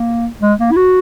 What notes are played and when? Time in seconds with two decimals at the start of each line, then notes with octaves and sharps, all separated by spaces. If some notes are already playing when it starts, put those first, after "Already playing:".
Already playing: A#3
0.42 G#3
0.60 A#3
0.72 E4
0.77 F#4